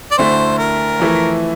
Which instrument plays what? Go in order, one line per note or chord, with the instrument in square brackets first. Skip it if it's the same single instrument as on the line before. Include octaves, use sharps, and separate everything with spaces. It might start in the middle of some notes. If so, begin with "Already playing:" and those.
[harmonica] D5
[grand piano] D2 D3 A3 E4 [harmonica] C5
[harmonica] A#4
[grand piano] F2 E3 A3 E4